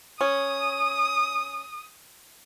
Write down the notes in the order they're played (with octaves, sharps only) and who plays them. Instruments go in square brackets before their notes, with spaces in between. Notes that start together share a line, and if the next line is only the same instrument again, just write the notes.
[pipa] C#4 [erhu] D#6